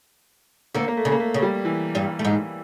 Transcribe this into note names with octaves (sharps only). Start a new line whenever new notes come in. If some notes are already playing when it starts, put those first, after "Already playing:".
D2 D3 A#3
A#3
A3
C#3
A#3
A3
C#3
G3
E3
G2 G3
A3
G#2 G#3